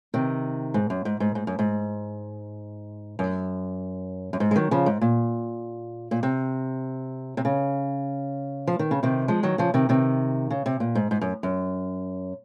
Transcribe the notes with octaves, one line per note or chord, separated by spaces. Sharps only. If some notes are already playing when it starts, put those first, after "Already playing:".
C3 D#3
G#2
F#2
G#2
G#2
G#2
F#2
G#2
F#2
F#2
G#2
G#3
D#3 F#3
C#3 F3
G#2
A#2
A#2
C3
C3
C#3
F3
D#3
C#3
C3 D#3
F3 G#3
D#3 F#3
C#3 F3
C3 D#3
C3 D#3
C#3
C3
A#2
G#2
G#2
F#2
F#2